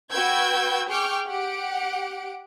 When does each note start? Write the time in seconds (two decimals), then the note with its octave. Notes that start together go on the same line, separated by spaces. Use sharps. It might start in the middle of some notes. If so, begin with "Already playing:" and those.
0.12 F#4 B4 G5 E6 G6 G#6
0.90 G#4 G5 C#6 D6 F6 G6
1.27 G4 F#5 D7